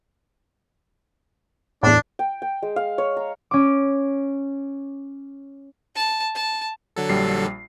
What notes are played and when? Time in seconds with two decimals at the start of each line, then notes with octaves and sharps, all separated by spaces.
1.83 E2 A2 D4
2.19 G5
2.42 G5
2.62 G#3
2.76 F5
2.98 C#5
3.17 A#5
3.51 C#4 D6
5.96 A5
6.35 A5
6.96 D3 F#3 A4
7.09 A#1 G3 C7